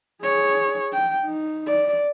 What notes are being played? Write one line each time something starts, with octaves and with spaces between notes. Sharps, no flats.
G#4 C#5
G5
D#4
D5